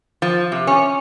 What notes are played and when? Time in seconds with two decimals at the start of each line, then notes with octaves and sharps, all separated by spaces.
0.22 F3
0.52 C3
0.67 C#4